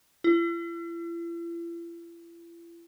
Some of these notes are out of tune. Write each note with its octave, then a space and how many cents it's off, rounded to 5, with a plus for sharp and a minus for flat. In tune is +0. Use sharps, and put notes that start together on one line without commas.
E4 +45